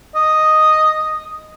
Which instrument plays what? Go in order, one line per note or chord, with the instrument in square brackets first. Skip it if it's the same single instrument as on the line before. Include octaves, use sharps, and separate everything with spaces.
[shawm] D#5